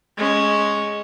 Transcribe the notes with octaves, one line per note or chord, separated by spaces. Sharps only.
G#3 C#4